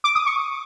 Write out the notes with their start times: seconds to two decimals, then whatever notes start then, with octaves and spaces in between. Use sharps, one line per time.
0.04 D6
0.15 D#6
0.26 C#6